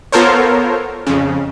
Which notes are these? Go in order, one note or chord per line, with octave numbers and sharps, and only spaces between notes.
B3 F4 A4 A#4 C5 C#5
F2 C#3